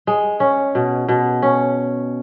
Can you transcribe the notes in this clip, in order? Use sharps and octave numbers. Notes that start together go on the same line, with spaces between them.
G#3
C#4
B2
B2
C#4